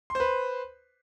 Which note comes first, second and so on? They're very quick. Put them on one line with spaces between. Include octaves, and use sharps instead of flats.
C6 C5 B4